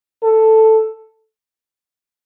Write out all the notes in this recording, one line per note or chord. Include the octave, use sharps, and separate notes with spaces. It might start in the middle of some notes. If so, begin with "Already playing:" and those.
A4